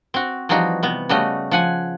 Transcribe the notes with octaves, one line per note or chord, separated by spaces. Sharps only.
C4 F#4
E3 F3 G3 D#4 F#4
C3 B3
C#3 G3 A3 F#4 D#5
F3 F#5 G#5